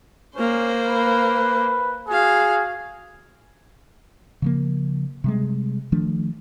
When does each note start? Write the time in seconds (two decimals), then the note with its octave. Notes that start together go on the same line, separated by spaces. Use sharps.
0.35 A#3 C#4 C5
0.86 B4
2.08 F#4 G#4 F5
4.42 C#3 F3 A#3
5.24 C3 G3 G#3
5.92 D#3 F3 A3 D4